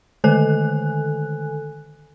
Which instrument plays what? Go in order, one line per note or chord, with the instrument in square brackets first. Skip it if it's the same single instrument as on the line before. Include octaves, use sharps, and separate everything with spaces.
[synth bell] D3 D#3 A4 G#5 F#6